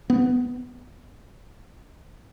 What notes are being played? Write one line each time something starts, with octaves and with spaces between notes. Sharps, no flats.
B3